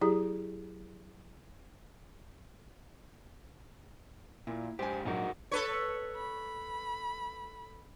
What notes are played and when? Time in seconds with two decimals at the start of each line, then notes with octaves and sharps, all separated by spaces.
0.01 F#3 E4 G4 G#4
4.47 A#2 E4
4.79 G#2 G4 C5 G#5
5.05 A#1 G#2 F#3 D#4 F#4 A#4
5.51 A4 B4 C#5
6.15 B5